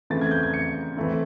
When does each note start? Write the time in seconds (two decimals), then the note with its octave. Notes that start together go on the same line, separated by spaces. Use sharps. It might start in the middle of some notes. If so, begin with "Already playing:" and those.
0.10 C#3 E3 A3 C4 A6
0.21 G#6
0.31 G6
0.43 G#6
0.54 C#7
0.97 E3 A3 C4